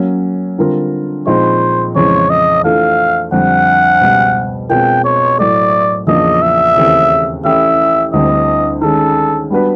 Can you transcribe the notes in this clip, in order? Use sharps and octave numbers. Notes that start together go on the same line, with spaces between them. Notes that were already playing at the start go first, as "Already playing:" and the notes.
Already playing: F#3 A#3 C#4
D3 G3 C4 F4 A#4
A#2 F3 G#3 C4 D#4 C5
F2 C#3 E3 G#3 C#5
D#5
E3 A3 D4 F4 A4 F5
F2 D3 G3 F#5
C#2 B2 G3
B2 G#3 C4 F4 A#4 G5
C#5
A2 F#3 A3 D5
E2 C#3 F3 A#3 D4 D#5
E5
D#2 C#3 E3 A3 C4
E3 A3 C#4 E4 G4 E5
D2 D3 G3 C4 E4 D#5
D#3 G#3 C#4 A4
G3 B3 D4 F#4 B4